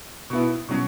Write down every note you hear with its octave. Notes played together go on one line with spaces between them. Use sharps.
B2 B3 E4
B2 F#3 C#4